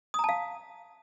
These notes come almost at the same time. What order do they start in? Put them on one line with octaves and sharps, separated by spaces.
D#6 A#5 A5 F5